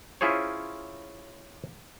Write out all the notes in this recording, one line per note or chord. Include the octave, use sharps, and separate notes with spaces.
C#4 E4 F4 G#4 C5 C#5